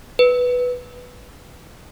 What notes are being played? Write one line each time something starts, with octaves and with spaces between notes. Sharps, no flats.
B4